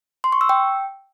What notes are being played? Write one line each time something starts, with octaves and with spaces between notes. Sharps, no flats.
C6
C#6
E6
G5